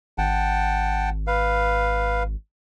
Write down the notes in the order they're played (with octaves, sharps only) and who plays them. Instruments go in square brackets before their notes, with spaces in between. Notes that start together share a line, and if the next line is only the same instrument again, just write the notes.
[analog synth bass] G#1 [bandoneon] F#5 G5 A5
[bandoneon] B4 F5